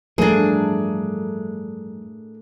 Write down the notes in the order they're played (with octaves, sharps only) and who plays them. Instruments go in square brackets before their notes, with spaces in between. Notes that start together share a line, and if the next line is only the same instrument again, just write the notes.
[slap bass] G2 E3 F3 [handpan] A3 A#4 [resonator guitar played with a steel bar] D4 G#4